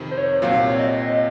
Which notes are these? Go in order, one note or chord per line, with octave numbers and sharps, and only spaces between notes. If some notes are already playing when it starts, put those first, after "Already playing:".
Already playing: F2 C3 D#3
C5
C#5
C2 A#2 F#3 C4 F5
C#5
D#5